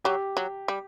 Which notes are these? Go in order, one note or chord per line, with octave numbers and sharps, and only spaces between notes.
F#3 G4
F#3
G3